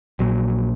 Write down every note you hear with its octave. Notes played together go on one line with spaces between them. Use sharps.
A#1 A#2 F#3